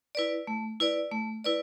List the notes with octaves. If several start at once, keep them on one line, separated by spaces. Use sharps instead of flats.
E4 B4 D5
A3
E4 B4 D5
A3
E4 B4 D5